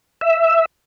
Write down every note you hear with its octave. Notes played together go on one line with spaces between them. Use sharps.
E5